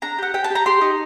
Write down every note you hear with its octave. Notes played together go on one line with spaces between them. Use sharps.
D4 A#5
G4 F#5
G4 G5
A5
G4 A#5
G4 C6
D#4